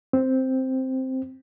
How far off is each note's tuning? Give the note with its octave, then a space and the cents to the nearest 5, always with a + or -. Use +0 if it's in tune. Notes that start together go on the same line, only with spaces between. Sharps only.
C4 +0